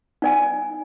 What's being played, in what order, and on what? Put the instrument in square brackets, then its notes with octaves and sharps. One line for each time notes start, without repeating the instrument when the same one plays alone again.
[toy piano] D#4 D5 G#5